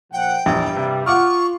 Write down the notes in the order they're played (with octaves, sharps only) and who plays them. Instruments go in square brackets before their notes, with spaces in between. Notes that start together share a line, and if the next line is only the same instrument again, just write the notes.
[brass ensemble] A#2 F3 F#5 [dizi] G5
[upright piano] A#1 E2 [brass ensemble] G2 G3
[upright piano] C3
[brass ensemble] F4 [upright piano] F#5 D6 F6 [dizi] C#6